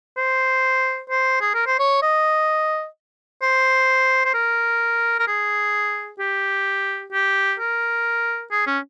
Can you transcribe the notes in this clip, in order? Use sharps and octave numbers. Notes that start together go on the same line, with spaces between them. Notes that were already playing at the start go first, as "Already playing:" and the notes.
C5
C5
G#4
A#4
C5
C#5
D#5
C5
C5
A#4
A#4
G#4
G4
G4
A#4
G#4
C#4